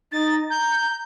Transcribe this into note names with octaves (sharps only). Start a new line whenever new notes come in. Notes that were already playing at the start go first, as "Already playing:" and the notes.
D#4 A6
A#5 G6